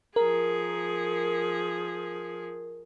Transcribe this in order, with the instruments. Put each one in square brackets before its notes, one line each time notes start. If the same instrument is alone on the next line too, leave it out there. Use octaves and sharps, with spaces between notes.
[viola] F3 G#4 [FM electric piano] A#4